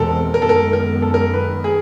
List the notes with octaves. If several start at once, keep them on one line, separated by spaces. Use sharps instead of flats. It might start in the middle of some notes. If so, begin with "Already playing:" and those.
Already playing: E2 B2 G#3 C4 G4 A4 A#4
F#2 D#3 G#3 B3 A#4
A4
A#4
A#4
A4
A#4
B4
G#4